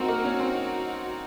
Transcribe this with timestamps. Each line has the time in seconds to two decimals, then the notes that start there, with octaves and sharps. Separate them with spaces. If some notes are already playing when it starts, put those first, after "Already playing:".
Already playing: C4 D#4 F#4 A#4
0.08 A#3
0.25 C#4
0.40 C4